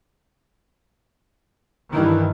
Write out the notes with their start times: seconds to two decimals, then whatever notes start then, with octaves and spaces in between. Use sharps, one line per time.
1.94 G2 D#3 E3 E4